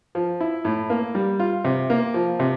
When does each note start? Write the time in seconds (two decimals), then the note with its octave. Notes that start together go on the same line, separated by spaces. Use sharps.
0.15 F3
0.40 E4
0.65 A2
0.90 A#3
1.15 G3
1.39 F4
1.65 C3
1.90 A#3
2.14 F3
2.40 C3